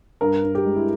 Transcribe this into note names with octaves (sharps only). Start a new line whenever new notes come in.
G2 A#4
G2
G4
G#3
E4